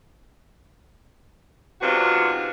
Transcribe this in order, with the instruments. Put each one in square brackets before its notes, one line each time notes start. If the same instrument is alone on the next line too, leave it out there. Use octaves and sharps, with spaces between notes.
[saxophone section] G#2 C3 B3 D4 F4 F#4